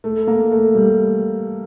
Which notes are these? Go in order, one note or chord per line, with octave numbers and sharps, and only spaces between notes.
A3
A#3
A3
G3